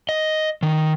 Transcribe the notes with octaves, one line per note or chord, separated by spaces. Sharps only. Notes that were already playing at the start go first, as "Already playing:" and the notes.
D#5
D#3